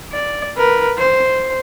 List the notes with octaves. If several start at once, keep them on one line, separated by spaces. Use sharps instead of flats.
D5
A#4 B4
C5